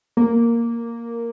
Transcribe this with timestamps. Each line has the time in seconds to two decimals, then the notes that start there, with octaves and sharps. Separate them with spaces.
0.17 A#3